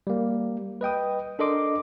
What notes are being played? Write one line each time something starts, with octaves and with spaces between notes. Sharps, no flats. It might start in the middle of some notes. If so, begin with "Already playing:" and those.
G3 A#3
B4 D#5 G5 D#6
D4 A4 A#4 D#5 C6 D6